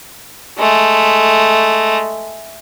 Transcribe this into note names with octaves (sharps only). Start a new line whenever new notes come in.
G#3 A3